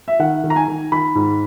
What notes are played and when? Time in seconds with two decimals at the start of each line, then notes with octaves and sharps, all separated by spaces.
0.08 E5
0.19 D#3 F#5
0.44 D#3
0.50 A#5
0.56 G#5
0.68 D#3
0.92 D#3 B5
1.15 G#2